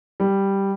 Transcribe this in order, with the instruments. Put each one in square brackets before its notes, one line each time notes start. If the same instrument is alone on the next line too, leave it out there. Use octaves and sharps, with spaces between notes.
[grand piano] G3